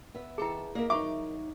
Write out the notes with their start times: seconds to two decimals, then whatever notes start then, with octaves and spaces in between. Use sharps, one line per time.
0.14 B3 E5
0.38 D#3 E4 G#4 A4 A5
0.75 A#3 A#4 D#5 E5
0.90 D#3 F#3 D#4 E5 C#6 D6